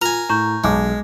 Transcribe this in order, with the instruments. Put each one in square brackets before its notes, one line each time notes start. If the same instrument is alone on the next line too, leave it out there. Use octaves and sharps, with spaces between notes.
[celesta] F4 F7 [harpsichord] A#4 G#5
[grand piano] A2 [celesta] A#5 C#6 G6
[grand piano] B1 G#4 D6 [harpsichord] G#3